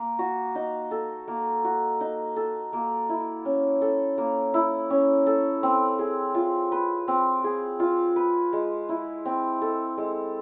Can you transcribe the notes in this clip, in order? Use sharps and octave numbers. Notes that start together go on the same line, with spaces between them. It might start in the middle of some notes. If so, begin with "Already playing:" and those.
Already playing: A#3
F#4
D#4
A4
A#3
F#4
D#4
A4
A#3
E4
C#4
A4
A#3
E4
C#4
A4
C4
G#4
F4
B4
C4
G#4
F4
B4
G#3
E4
C4
A4
G#3